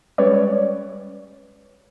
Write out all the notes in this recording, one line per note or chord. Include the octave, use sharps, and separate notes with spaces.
G3 G#3 C#4 B4 C#5 D5